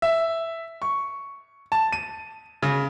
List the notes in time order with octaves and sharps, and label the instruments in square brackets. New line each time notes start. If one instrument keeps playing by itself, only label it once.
[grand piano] E5
C#6
A5
D#7
C#3